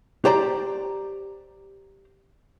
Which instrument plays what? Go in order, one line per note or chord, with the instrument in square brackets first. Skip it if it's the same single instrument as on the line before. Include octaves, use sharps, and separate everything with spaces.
[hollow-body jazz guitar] G4 C5 D5 A#5